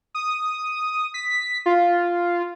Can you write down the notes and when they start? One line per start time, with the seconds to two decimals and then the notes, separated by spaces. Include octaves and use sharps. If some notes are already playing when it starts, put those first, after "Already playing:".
0.15 D#6
1.14 B6
1.66 F4